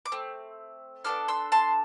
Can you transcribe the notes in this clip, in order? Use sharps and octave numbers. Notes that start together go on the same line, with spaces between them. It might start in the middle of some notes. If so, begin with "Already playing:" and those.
D6
A3 C4
B3 D4 F4 A4 D6 F6
C6 E6
A5 C6